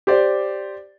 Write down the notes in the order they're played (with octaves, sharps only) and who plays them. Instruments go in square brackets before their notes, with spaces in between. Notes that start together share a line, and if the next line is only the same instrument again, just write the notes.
[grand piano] G4 C5 D5